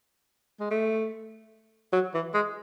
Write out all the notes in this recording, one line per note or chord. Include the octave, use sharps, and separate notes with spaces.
G#3
A3
F#3
E3
G#3